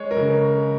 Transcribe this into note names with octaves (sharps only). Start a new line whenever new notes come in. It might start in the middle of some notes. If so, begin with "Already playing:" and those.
Already playing: G#3 C#5
A#4
C#3